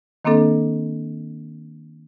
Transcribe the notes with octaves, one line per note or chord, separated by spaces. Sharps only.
D#3 A#3 C4 D4 A4